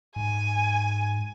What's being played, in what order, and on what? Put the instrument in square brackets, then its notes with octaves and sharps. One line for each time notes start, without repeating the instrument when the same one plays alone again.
[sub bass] G#2 [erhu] G#5